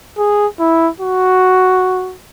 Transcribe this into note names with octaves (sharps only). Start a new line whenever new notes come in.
G#4
E4
F#4